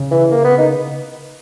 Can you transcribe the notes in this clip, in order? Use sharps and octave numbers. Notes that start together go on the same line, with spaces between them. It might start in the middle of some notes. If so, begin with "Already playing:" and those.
Already playing: C#3
E3
A#3
B3
D#4